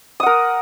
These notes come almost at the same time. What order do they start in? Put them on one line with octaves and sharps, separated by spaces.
D#6 F#5 A#4